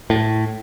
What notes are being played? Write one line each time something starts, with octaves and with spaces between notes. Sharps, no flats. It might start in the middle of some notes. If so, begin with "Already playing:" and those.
A2